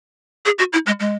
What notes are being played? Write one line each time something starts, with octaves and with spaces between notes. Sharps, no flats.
G#4
F#4
E4
G#3
G#3